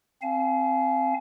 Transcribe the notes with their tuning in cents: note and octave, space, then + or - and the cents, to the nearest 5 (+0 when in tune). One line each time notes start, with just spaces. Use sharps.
C4 +5 F5 -20 G#5 +40